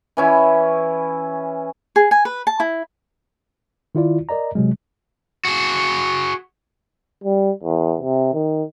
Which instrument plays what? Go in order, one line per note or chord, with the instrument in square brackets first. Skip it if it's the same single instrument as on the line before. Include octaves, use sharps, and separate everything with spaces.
[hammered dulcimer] E3 C#4 E4
[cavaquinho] G#4
G#5
B4
A5
E4
[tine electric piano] D#3 E4 F4 D5
A#4 D5 D#5 A#5
C3 F#3 G#3
[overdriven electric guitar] F#4 G#4
[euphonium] G3
E2
C3
D#3